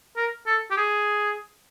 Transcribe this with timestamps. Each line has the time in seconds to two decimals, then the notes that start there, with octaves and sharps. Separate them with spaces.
0.17 A#4
0.47 A4
0.71 G4
0.77 G#4